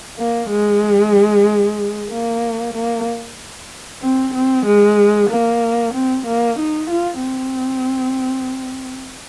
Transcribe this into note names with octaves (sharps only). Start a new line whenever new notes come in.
A#3
G#3
A#3
A#3
C4
C4
G#3
A#3
C4
A#3
D#4
F4
C4